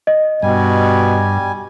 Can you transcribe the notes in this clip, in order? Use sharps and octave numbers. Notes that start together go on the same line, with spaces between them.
D#5
G2 B2 G3 G#5